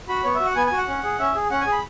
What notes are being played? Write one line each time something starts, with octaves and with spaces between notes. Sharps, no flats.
F#4 B5
B3 C#5
E5
F#4
F#5
B3 G#5
G#5
F#4
F#5
C#4
G#4
C#4 E5
G#4
C#4 F#5
G#5
G#4
B5